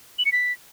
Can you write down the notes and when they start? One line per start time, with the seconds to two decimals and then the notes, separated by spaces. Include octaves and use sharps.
0.19 F#7
0.25 C#7
0.32 B6